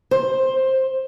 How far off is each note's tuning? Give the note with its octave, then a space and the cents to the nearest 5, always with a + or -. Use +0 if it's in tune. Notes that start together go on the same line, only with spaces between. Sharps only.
C5 +10